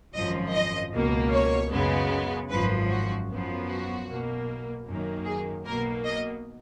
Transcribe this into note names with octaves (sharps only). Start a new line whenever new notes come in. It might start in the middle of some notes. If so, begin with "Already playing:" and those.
G#1 F#2 F3 D#5
D#5
C#2 B2 A#3
C#5
F#2 C#3 G#3 B3
G#1 F#2 F3 B4
F#4
F#2 F3 B3
F#4
B1 B2 A#3
F#2 D#3 A#3
G#4
B1 B2 A#3 A#4
D#5